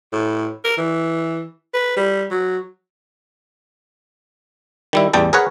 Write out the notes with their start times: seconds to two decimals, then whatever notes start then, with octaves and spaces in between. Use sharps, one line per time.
0.13 A2
0.65 A#4
0.78 E3
1.74 B4
1.97 G3
2.31 F#3
4.93 D#3 G3 E4
5.13 A1 E2 G3 G5 A5
5.33 G#4 A#4 B4 C#5 F#5